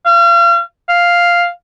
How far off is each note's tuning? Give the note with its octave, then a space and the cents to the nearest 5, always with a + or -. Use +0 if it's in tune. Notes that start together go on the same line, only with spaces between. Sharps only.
F5 -35
F5 +0